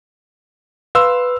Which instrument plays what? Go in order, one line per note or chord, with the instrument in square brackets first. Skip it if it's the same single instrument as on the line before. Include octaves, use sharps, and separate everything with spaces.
[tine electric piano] B4 [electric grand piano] F5 C6 E6